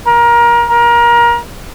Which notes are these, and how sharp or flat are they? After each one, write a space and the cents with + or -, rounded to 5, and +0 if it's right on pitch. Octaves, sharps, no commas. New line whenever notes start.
A#4 +25
A#4 +25